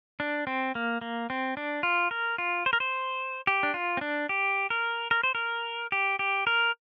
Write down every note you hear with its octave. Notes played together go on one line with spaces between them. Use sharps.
D4
C4
A#3
A#3
C4
D4
F4
A#4
F4
C5
A#4
C5
G4
D4
F4
C4
D4
G4
A#4
A#4
C5
A#4
G4
G4
A#4